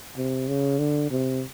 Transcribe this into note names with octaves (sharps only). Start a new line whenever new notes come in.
C3
C#3
D3
C3